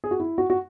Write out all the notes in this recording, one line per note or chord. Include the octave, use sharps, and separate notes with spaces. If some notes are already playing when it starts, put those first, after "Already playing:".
G#4
F#4
E4
F#4
F#4